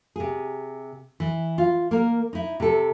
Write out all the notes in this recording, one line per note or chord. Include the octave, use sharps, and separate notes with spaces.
C3 G#4
E3
F4
A#3 A#4
D#4 E4
C3 A4